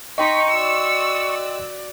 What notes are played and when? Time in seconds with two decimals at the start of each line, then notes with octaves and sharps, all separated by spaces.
0.18 D#4 D#5 G5 C6 C#6 B6
0.50 F#4 D5 E6